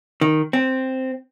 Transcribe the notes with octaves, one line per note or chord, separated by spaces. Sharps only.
D#3
C4